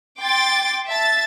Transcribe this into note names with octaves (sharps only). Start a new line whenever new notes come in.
G5 C6 D6 A6
E5 A5 A6